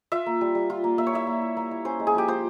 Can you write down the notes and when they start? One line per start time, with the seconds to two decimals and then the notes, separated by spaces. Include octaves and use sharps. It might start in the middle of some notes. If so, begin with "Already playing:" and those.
0.12 F4 E5
0.26 A#3
0.41 G3
0.55 G3
0.70 F4
0.84 A#3
0.98 A#3 E5
1.07 C#5
1.13 E4 E5
1.27 A#3
1.42 E4
1.57 A#3
1.71 E4
1.85 C#4 C5
2.00 G#3
2.07 G#4
2.14 F3 G4
2.28 F4 C5